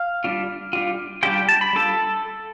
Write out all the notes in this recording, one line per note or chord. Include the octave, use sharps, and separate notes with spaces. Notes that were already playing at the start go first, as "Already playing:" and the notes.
Already playing: F5
G3 D4 F4
G3 D4 F4
G3 D4 F4 G4 G5
A5
B5
G3 D4 F4 A4 A5